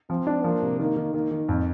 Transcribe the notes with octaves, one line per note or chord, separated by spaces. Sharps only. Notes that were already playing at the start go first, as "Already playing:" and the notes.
F3 C4
D4
F3 A#3
C3
D#3 A#3
D#3
D#3 A#3
D#3
F2